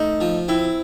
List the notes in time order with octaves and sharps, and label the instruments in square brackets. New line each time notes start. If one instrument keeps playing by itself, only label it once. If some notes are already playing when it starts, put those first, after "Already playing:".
Already playing: [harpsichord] A3 [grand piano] D#4
[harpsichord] F3
[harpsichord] C4 [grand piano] E4